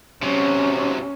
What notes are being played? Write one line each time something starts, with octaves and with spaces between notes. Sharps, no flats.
C3 F#3 C#4